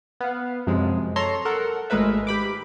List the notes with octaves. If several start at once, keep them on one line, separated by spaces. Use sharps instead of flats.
B3 F5
F#2 C3 F3 G#3
A4 C#5 A#5 C6
A4 A#4 F#5
G#1 G#3 A3 A#4 B4 E5
G4 B5 D6